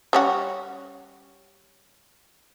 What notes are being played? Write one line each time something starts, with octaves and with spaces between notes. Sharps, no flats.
G3 C#4 F#4